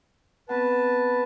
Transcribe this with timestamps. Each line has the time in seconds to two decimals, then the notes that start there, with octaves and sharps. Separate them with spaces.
0.49 B3 C4 B4 F#5 A5